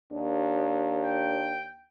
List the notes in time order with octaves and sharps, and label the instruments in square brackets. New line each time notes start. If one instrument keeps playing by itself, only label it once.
[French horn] D#2 [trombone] D4
[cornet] G5